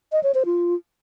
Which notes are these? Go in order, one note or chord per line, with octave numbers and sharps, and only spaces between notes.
D#5
C#5
C5
F4